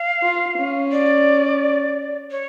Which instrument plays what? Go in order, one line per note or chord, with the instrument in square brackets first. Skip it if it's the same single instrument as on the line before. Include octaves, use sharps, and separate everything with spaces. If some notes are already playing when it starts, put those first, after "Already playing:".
Already playing: [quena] F5
[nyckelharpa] F4
C#4
[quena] D5
C#5